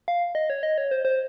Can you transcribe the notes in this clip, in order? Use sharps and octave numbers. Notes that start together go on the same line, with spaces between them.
F5
D#5
C#5
D#5
C#5
C5
C5